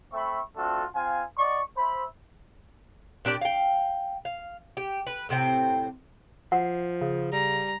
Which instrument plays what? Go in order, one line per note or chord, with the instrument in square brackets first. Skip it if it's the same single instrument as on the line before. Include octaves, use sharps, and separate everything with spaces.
[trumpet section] A3 C4 E5 B5 C#6
A3 C4 D4 F4 F#4 A4
C4 F4 F5 G#5
D5 D#5 F#5 C#6
C5 E5 B5
[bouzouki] A#2 D4 G4 D5
F5 G5
F5
G4
B4
A2 C3 C4 G5
[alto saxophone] F3 [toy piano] F#5
[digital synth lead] C#3
[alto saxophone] G3 [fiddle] A#5